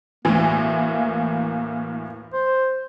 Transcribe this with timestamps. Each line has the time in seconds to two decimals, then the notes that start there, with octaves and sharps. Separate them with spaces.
0.25 D2 A2 E3 A#3
2.33 C5